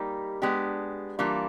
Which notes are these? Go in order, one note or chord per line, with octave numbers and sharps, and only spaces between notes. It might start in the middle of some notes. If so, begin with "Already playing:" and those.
Already playing: G3 A#3 D#4 G4
G#3 B3 D4 G4
E3 G3 A#3 D4 F4